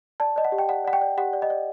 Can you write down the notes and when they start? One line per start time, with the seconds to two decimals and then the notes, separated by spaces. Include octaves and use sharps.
0.20 D5 A5
0.36 D5 D#5
0.45 F#5
0.52 G4
0.58 G5
0.69 D5 F#5
0.85 D5 F#5
0.93 G5
1.01 D5
1.17 G4 F#5
1.33 D5
1.42 D#5
1.50 D5